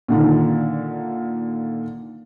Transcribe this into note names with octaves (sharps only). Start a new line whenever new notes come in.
A#2 D3 D#3